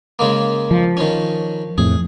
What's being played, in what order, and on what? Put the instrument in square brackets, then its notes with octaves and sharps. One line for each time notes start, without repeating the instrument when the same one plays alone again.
[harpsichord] C#3 G#3 A#3
[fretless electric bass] F3
[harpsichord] D#3 C#4
[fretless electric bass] F2 A2 [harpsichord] G#4